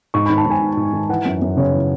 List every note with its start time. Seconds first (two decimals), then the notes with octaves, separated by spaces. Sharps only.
0.14 G#2 C#6
0.26 D#3 B5
0.38 A5
0.46 G#2 G#5
0.62 D#3
0.77 G#2
0.93 D#3
1.09 E3 F#5
1.25 F#2
1.42 F#2
1.57 C#3 C#5
1.73 E3